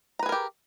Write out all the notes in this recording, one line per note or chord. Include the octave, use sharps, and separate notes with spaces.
G4 G#4 A#4 B4 A#5